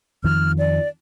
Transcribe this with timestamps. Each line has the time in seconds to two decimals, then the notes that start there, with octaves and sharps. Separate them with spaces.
0.24 F2 D#3 F3 F6
0.59 D5